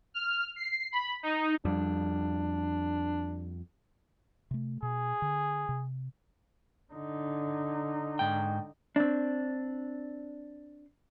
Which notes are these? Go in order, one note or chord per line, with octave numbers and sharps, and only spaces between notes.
F6
C7
B5
D#4
F2 G3 D4
C3 A3
B2 G#4
D3
C3
D3 D#4
G#2 G5
C4 D4